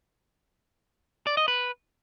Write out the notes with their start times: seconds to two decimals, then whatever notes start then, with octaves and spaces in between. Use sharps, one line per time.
1.27 D5
1.37 D#5
1.48 B4